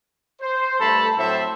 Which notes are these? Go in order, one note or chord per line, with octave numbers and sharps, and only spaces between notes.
C5
G2 A3 A4 A5 B5
A2 F#3 C4 A4 C5 E5